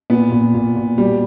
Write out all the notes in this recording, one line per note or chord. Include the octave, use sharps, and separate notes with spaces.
A#2 B3
A#2
A#2
A#2
B2 G3